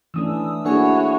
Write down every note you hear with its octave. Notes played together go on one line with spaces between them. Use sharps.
E3 A3 C#4 D4 D#6 E6
A#3 D4 E4 F#4 G#4 A4 C#5 G#5